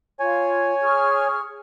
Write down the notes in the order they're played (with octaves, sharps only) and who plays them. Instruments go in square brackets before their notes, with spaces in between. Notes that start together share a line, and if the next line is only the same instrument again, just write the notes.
[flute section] F4 [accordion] C#5 G#5
[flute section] G#4 C#6 F6